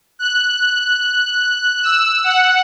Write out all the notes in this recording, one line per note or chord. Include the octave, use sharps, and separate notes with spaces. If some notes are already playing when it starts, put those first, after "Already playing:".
F#6
E6
F#5